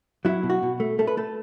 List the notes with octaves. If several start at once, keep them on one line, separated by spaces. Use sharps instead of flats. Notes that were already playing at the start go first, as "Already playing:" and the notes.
F#3 E4
B2
F#4
B2
A3
A3 A4
B4
A3 A4